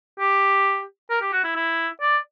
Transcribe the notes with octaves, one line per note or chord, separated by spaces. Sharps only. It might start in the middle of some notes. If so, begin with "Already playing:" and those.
G4
A#4
G4
F#4
E4
E4
D5